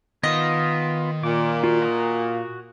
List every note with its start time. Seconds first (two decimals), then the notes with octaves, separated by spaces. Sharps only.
0.23 D#3 B3 F4 D#5
1.23 A#2 D6
1.64 F4 F#4
1.82 F#4 A#5 D#6